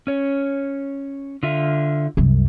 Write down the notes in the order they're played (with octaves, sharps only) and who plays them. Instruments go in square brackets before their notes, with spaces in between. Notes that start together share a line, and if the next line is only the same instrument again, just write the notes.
[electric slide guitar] C#4 C#5
D3 F4 E5
[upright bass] C2 F#2